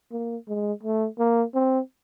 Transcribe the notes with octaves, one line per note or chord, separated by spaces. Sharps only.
A#3
G#3
A3
A#3
C4